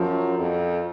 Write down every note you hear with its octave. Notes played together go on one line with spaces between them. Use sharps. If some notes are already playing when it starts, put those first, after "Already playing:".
Already playing: F#2 F3
F2